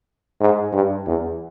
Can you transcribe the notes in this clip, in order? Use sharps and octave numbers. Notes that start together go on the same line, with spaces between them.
G#2
G2
E2